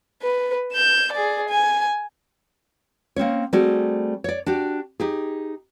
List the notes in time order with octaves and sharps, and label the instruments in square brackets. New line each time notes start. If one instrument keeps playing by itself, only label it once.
[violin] B4
G6 E7
G#4 D5
G#5
[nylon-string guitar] A#3 C4 C#4 C#5
G3 A3 C4 F#4 G#4
C#5 D5
D4 F#4 G4
D#4 G4 G#4